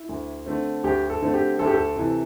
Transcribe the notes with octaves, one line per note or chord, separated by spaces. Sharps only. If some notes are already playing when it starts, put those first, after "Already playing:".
Already playing: E4
D2
D3 A3 C4
D2 G4
A4
D3 A3 C4
G4
D2 A4
G4
A4
C3 E3